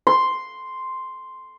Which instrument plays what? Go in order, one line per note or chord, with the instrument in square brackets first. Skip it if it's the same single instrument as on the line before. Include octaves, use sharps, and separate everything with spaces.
[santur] C6